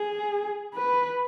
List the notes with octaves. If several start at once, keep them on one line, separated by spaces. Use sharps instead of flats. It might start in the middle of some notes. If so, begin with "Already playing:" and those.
Already playing: G#4
B4